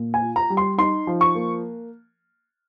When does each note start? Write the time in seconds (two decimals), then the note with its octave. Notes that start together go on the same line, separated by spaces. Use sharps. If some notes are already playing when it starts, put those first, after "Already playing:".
Already playing: A#2
0.14 G#5
0.22 F4
0.36 A#5
0.50 G3
0.57 C6
0.78 D#4 C6
1.07 F3
1.21 C#6
1.35 A#3